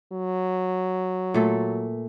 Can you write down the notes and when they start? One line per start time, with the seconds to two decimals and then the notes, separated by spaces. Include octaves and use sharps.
0.12 F#3
1.34 A#2 A3 A4